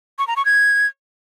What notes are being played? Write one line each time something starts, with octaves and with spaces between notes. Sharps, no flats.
C#6
A#5
C#6
G#6